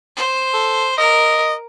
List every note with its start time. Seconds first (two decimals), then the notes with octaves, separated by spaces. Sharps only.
0.16 C5
0.54 A4
0.98 A#4 D#5